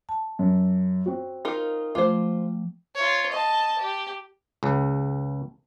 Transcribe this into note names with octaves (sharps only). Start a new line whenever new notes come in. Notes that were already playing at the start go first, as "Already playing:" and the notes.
A5
F#2
C4 F#4
D#4 F4 A#4
F3 A3 F4 C5 D6
F4 C#5
D#5 A5
G4
C#2 C#3